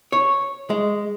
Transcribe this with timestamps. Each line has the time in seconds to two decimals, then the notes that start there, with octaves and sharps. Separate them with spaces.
0.12 C#5
0.70 G#3